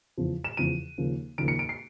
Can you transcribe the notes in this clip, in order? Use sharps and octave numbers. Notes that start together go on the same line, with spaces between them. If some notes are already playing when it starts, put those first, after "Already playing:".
E2 C#3 F3
E7
E2 C#3 F3 D#7
D#2 C#3 F3 A#3
D#2 C#3 F3 A#3 D7
C#7
D7
C7